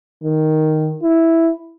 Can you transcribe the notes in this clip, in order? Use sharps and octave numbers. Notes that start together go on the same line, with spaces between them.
D#3
E4